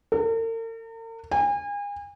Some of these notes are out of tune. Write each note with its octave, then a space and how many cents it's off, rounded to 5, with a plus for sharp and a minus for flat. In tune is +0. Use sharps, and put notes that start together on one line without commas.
A#4 -45
G#5 -35